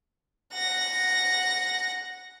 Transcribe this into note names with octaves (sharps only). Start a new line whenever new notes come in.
F#5 A#6